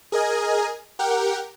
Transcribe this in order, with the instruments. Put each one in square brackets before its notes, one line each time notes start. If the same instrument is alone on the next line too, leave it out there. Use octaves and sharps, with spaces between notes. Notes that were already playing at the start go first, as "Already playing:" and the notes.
[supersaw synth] G#4 A#4 D#5 G#5
G4 A#4 F#5 G5